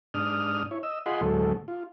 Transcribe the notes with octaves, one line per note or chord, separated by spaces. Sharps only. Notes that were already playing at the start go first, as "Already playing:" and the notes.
G#2 D4 D#6 F6
E4 C#5
D#5 E6
F4 G#4 D#5 F#5 B5 C6
D2 A2 F#3 G#3 A3 A4
F4